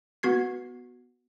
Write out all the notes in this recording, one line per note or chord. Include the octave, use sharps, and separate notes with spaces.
B3 F#4 G#6 C7